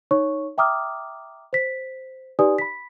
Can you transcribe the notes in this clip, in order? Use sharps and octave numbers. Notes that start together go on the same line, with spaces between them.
D#4 C#5 C#6
E5 G5 A#5 D6 D#6 F6
C5 B6
D#4 G4 B4 D5 G#5 D#6
B5 B6